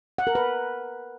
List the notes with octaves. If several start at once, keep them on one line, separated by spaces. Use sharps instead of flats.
F#5
A#4
B4